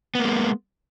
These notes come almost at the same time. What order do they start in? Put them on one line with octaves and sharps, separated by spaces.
B3 A#3 G#3